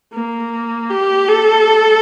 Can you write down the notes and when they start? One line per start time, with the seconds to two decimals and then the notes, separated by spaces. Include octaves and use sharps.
0.13 A#3
0.90 G4
1.28 A4